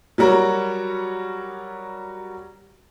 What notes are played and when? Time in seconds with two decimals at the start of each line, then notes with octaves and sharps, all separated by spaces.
0.18 F#3 G3 F#4 A#4 C#5